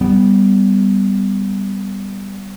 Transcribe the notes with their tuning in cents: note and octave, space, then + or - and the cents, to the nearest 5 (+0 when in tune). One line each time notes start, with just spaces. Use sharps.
G3 +0 B3 +0